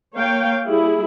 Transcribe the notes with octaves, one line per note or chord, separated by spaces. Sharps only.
A#3 C#5 F5 G5
G3 E4 G#4